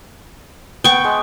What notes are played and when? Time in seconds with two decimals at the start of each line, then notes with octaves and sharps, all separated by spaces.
0.84 B3 G5 C#6
1.04 G#3